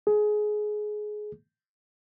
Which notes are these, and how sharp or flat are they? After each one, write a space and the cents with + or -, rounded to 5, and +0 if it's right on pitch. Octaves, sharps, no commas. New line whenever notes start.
G#4 +20